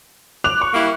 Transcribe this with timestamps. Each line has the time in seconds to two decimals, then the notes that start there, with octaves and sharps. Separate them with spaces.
0.44 D6 F#6 F7
0.61 C#6
0.74 G3 A#3 E4